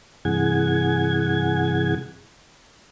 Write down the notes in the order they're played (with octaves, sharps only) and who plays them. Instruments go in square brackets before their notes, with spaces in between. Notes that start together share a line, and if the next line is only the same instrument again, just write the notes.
[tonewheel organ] G2 C3 E3 G#4 F#5 G#6